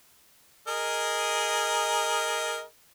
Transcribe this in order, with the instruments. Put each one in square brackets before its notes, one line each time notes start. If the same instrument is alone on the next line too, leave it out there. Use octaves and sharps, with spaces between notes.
[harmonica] G#4 A#4 D#5